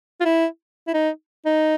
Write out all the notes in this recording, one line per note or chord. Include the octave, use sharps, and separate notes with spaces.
F4
E4
E4
D#4
D#4